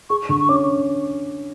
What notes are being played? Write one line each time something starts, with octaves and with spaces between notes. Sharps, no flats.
G#4 C#6
D3 C#6
C#6
C#4 D6